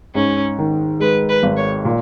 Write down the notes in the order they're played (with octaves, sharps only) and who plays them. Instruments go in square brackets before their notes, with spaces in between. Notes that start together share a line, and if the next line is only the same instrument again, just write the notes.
[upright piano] G#2 [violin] C#4
[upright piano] D#3
[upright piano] G#3 [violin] B4
[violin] B4
[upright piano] G#1
[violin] C#5
[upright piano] A#2